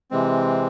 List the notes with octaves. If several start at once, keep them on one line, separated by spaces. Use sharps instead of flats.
C3 E3 G#3 C4